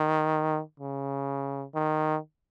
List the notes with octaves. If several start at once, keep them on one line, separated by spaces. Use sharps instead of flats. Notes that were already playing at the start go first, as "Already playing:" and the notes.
Already playing: D#3
C#3
D#3